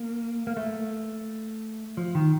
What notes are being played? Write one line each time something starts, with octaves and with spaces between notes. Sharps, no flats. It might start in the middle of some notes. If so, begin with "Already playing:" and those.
Already playing: A#3
A#3
A3
F3
D#3